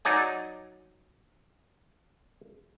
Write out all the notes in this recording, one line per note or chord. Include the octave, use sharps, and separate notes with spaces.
F#3 D#4 D5 G#5